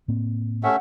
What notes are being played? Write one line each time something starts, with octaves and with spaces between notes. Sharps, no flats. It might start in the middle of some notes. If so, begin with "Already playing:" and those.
A2 A#3 C4
A3 C#4 G4 E5 F#5